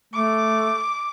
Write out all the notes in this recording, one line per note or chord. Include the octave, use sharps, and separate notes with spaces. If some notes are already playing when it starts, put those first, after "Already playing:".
A3 D6